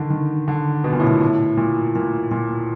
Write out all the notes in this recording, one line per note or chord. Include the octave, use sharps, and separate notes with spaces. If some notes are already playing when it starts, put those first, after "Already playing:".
Already playing: D3 D#3
D#3
D3
B2
A#2
A2
A#2
A2
A#2
A#2
A#2